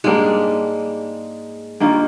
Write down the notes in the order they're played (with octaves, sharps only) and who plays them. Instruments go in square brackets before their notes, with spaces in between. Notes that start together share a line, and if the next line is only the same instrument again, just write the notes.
[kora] G#2 G3 A#3 D4 [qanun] G#3
[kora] G2 D#3 A#3 F4